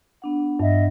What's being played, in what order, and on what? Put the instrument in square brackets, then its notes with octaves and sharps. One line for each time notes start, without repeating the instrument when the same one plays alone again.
[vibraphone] B3 D4 F#5
[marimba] G2 [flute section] D#5 E5